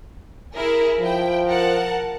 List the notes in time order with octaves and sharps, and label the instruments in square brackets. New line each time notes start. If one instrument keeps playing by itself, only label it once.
[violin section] E4 G#4 A#4
[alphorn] F3 [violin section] E4 G5
[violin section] A#4 F#5 A5